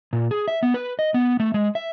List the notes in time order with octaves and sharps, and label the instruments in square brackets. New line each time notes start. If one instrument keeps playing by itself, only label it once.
[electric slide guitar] A#2
G#4
E5
B3
B4
D#5
B3
A3
G#3
E5